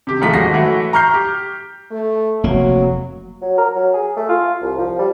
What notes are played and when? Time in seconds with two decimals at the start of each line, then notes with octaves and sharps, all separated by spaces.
0.07 C3 G4
0.21 D#2 G#2 F3 G#3 A3 B6
0.34 D#1 G#3 F#4 A#6 C7
0.53 E3 F#3 A3 E4 F#4
0.93 A#5 C#6 F6 G6 C7
1.14 G4
1.91 A3
2.44 F1 F#3 A#3
3.42 F#3
3.58 A#4
3.75 F#3
3.94 G#4
4.17 A3
4.29 F4
4.62 C2
4.78 F3
4.99 G3